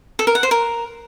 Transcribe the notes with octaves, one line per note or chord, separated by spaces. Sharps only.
A4
A#4
F#5
C5
A#4